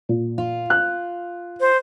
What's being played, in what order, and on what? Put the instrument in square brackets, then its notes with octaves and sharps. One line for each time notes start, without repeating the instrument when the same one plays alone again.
[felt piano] A#2
[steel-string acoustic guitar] F4
[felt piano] F#6
[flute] C5